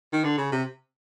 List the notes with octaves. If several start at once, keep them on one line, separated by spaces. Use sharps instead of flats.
D#3
D3
C#3
C3